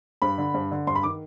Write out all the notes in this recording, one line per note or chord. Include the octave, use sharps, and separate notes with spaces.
G2 B5
D3
G2
D3
G2 C6
B5
D#3 D6